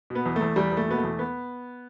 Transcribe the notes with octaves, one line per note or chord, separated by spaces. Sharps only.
B2 B3
E2
A3
E2
E2 G3
E2
A3
B2 B3
A3
E2
B3